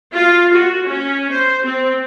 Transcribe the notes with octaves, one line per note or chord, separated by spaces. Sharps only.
F4
F#4
C#4
C5
C4